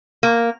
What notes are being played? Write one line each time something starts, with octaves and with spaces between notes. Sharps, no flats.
A#3